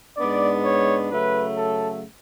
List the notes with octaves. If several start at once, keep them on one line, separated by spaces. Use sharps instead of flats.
G#2 G#3 B3 D4 D5
C#5
C#3 F#3 A3 B4
A4